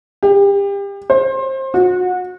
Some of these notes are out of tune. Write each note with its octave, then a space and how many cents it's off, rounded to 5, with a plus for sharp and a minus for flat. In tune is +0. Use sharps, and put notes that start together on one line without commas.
G4 +30
C5 +25
F#4 -25